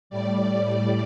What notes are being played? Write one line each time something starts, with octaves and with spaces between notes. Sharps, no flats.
A2 G3 D5